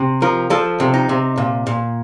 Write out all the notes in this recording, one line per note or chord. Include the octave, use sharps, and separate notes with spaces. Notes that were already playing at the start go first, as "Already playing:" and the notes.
Already playing: C3
F3 A#4
F3 A4
C3
D#4
C3
A#2
A#2